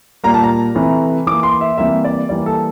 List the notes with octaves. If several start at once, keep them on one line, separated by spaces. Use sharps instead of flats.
A#2 G3 A#3 A#5
A5
A#5
C3 E3 A3
E3 A#3 D6
C6
E5
C3 E3 G3 A#3 E5
D5
E3 G3 A#3 D5
A4